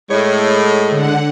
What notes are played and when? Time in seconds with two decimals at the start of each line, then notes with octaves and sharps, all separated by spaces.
0.10 A2 G#3 C#5
0.90 D3 F#5